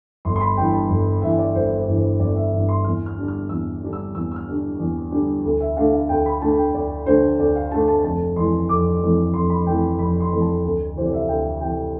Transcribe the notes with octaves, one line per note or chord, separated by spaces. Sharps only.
G1 C6
C6
B5
G2 E3 G5
A5
G1
G2 E3 E5
D5
G1 C5
C5
G2 E3
C5
G1 D5
E5
G2 E3
C6
E2 F6
F6
D3 G3 D4
F6
E2 E6
D3 G3 D4
E6
E2 E6
E6
F6
D3 G3 D4
E2
D3 G3 D4
D2
E5
D3 A3 D4 F5
F5
D2 G5
B5
D3 A3 D4 A5
G5
D2 D5
D3 A3 D4 C5
D2 D5
F5
D3 A3 D4 A5
A5
F1 A5
F2 E3 A3 C6
F1 D6
F2 E3 A3
F1 C6
B5
F2 E3 A3 G5
F1 B5
C6
F2 E3 A3
A5
D2
C3 E3 C5
D5
E5
F5
D2 G5
C3 E3 G5